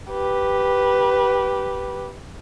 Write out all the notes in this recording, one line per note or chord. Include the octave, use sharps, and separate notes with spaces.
G4 B4